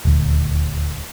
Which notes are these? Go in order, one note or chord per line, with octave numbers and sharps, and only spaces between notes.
D#1 D2